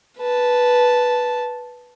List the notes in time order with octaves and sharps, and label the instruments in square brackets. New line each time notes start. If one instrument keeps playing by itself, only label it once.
[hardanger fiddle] B4 A5